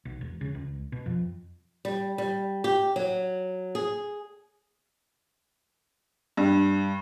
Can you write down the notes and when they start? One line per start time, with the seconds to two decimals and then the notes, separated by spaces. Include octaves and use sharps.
0.05 B1
0.21 E1
0.41 C#3
0.55 C#2
0.92 B2
1.06 F2
1.85 G3
2.18 G3
2.64 G4
2.96 F#3
3.75 G#4
6.37 G2